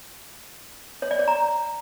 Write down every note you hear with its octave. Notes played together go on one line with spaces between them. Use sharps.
C#5
D5
C#5
A#5